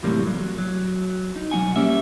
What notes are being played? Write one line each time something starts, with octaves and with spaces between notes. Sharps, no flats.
E2 A2 C3 F#3 G3 A#3
F#3
F#3
D#4
B1 F#3 D4 F#5 G#5
G3 A#3 C#4 E5